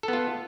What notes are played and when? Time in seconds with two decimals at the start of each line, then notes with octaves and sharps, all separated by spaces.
0.03 A4
0.08 B3
0.13 F4